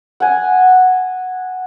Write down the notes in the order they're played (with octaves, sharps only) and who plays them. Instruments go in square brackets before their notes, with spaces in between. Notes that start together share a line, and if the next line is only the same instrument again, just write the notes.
[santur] F#5 G#5